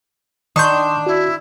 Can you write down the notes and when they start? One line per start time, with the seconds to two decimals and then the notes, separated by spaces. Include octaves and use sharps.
0.56 D#3 D4 C6 C#6 D#6 G6
1.07 E4 F#4